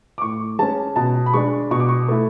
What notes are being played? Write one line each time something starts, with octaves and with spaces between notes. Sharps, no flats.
D6
A2 C#6
G#3 C#4 A5
B2 A5
B5
G#3 D4 C#6
B2 C#6
D6
C#6
A3 E4